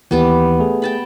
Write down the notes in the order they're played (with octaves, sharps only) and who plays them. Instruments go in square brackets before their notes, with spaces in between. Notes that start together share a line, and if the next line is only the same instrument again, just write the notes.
[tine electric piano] D#2 E3 [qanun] G3 B3 G4
[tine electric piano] A3 G#4
[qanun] G5 A5 B5